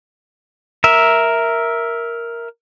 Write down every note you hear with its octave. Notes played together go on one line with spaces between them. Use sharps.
A#4 E5